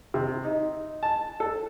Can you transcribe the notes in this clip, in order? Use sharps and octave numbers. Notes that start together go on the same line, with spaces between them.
C3
D#4
A5
A4